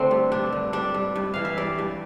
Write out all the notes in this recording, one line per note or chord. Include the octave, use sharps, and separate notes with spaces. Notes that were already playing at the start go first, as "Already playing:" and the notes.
Already playing: D3 A3 C4 D4
G2
G2 D4
D3
G3 D4
G2
G2
E3 F5
E5
G3 D5
G2